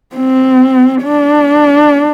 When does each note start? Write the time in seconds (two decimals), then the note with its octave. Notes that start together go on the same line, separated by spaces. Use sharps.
0.16 C4
1.04 D4